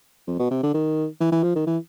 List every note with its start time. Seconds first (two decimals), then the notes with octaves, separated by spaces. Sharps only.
0.27 F2
0.39 B2
0.51 C3
0.63 D3
0.74 D#3
1.20 E3
1.32 E3
1.43 F3
1.56 D#3
1.67 E3